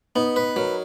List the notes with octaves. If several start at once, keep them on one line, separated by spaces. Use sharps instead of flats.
B3 D#4
B4
F#3 A#4